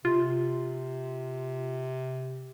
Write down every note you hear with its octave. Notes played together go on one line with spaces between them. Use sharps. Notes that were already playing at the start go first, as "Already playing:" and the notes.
C3 F4